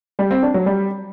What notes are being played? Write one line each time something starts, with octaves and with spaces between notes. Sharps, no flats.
G3
C4
D4
F#3
G3